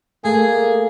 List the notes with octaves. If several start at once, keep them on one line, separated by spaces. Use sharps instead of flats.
A3 A#3 G#4